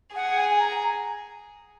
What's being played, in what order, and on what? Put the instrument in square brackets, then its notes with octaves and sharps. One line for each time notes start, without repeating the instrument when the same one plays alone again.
[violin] G#4 [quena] F#5
[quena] G#5
A#5